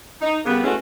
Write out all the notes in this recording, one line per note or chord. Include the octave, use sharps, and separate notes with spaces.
D#4
C#3 G3 A#3 B3
G#3 A3 B3 C#4 E4 F#4